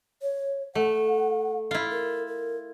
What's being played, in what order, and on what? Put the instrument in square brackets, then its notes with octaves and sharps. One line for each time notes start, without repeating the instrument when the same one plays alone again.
[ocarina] C#5
[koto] A3 [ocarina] F#5
[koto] E4 F4
[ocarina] A#4
A#4